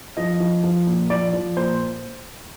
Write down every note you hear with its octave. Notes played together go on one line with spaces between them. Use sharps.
F3 D#5
F3
F3
A#2
F3 D5
F3
A#2 C5